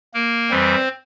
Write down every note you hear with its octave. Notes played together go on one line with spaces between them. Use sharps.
A#3 A#4
F2 E3 G3 C4 C5